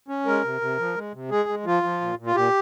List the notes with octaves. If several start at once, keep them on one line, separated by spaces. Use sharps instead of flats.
C#4
G#3 A#4
C3
C3
F3
G#3
C3
G#3 G#4
G#3
F3 F4
F3
A#2
A#2
F4
A#2 G4